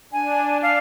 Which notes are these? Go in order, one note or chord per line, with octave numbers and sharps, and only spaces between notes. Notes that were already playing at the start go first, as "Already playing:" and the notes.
D4 G#5
F5